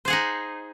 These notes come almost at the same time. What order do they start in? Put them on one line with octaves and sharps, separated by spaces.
C5 G#4 F#5 D#4